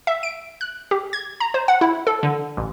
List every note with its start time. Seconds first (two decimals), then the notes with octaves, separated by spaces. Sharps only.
0.07 E5
0.23 D7
0.61 F#6
0.91 G4
1.13 G#6
1.40 A#5
1.54 C5
1.68 F#5
1.81 E4
2.07 A4
2.23 D3
2.57 A1